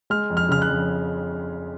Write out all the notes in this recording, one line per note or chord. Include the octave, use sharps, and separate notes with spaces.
G#3 F6
F2
F6
C#3 F6
F#6
F2